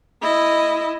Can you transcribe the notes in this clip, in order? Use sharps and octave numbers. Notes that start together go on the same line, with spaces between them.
E4 D#5